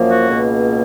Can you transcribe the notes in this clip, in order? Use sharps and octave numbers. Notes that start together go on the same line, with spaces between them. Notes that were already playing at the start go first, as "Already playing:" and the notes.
Already playing: F#2 F3 A#3
F#4
C#2 B2 A#3